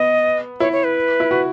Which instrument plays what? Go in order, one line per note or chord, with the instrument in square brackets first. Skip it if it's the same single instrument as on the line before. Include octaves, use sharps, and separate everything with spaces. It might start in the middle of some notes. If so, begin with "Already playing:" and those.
Already playing: [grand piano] B3 [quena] D#5
[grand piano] E4 [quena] C#5
[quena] C#5
B4
[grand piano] E4
F#4